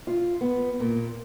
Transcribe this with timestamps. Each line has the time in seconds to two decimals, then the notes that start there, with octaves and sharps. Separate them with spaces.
0.07 F4
0.41 B3
0.80 A#2